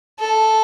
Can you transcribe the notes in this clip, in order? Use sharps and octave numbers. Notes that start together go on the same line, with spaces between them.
A4